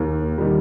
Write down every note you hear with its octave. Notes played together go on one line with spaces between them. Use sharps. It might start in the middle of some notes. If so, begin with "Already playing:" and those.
Already playing: D#2
D#3 G3